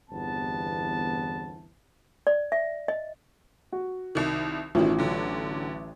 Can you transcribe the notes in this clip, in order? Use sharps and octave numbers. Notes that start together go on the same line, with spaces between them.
G1 E2 C3 E3 B3 A5
D5
E5
D#5
F#4
C2 D#3
A1 B2 D#3 E4 F4
D3 F#3